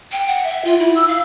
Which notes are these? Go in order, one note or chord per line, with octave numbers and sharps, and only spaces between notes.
G5
F#5
E5
F4
E4
E6
F5